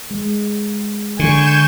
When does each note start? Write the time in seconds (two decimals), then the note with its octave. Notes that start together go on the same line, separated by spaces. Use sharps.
0.11 G#3
1.19 D3 G#5 C#6 G6 E7